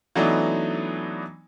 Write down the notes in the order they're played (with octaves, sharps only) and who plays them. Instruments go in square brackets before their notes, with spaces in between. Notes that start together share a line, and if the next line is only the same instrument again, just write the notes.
[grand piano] E3 F#3 A3 B3 D4 D#4